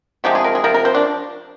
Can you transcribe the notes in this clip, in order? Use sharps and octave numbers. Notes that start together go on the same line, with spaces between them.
C3 F3 G#3 G4
G#4
A#4
G#4
C3 F3 A#4
A#4
C5
D4